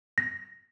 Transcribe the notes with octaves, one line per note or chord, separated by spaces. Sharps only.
A#6